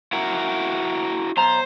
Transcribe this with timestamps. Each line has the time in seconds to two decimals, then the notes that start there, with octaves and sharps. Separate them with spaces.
0.13 E4 F#4 A#4
1.37 B1 C5 A#5